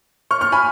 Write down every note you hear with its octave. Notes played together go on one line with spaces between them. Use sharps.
C#6 F6
C#6 F6
G#5 B5